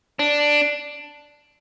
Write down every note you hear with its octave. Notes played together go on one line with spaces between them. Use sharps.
D4